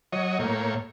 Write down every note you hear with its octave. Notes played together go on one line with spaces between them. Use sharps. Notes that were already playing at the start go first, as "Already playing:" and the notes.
F#3 C#5 D#5
A2 A#3 C#5